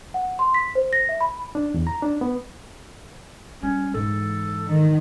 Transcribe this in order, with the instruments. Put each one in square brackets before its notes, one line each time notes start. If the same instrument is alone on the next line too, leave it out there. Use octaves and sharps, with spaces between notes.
[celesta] F#5
C6
B6
C5
A#6
E5
B5
[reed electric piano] D4
E2
A#5
D4
B3
[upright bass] G3 [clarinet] C#4
[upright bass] G#2 E3 [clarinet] A4
[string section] D#3